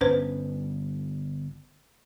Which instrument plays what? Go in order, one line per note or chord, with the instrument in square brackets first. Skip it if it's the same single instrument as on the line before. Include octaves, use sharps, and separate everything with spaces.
[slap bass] G1 G2 B3 [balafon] C#4 B4 C5